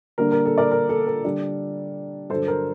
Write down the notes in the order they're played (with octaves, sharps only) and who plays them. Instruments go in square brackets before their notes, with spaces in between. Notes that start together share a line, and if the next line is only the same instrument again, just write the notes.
[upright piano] D3 G3 A#3 D4 A#4
A#4
A4
A#4 D5
A#4
A4
A#4
D3 G3 D4
G2 D3 F#3 A4 C5
A#4